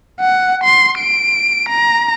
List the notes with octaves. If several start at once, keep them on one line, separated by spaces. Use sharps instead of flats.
F#5
C6
D7
A#5